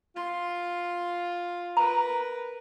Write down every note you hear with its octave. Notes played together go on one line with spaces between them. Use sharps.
F4 C6
A#4 B4 A#5